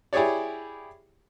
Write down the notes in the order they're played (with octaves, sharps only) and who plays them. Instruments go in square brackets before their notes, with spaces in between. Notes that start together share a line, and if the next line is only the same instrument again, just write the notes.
[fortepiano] E4 G4 G#4 C#5 D5